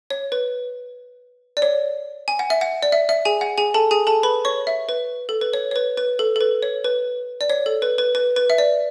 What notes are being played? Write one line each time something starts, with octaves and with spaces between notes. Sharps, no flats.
C#5
B4
D5
C#5
G#5
F#5
E5
F#5
D5
E5
E5
G#4 G#5
F#5
G#4 G#5
A4 A5
G#4 G#5
A4 A5
B4 B5
C#5 C#6
E5
B4
A4
B4
C#5
C#5
B4
B4
A4
A4
B4
C#5
B4
D5
C#5
A4
B4
B4
B4
B4
E5
D5